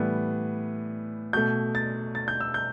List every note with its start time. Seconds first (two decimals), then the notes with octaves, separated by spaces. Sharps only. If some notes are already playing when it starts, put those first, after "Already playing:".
Already playing: A2 E3 G3 B3
1.33 B2 A3 G6
1.75 A6
2.15 A6
2.28 G6
2.40 E6
2.54 G6